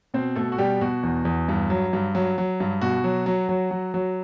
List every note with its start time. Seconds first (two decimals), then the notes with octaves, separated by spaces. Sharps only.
0.14 B2 C4 C5
0.36 B2 A3 A4
0.52 F#4
0.58 B2 G3 G4
0.81 B2 F#4
1.03 E2
1.25 E2
1.49 G2
1.70 F#3
1.93 G2
2.15 F#3
2.38 F#3
2.60 G2
2.81 B2 F#4
3.04 F#3
3.26 F#3
3.49 F#3
3.71 F#3
3.94 F#3